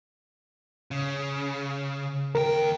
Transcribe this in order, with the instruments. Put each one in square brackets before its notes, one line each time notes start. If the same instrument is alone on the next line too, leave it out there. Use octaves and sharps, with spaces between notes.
[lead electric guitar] C#3
[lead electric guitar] D#2 G5 [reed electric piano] A#4